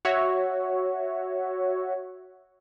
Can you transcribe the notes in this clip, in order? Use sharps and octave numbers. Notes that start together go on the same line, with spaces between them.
F#4 C#5 E5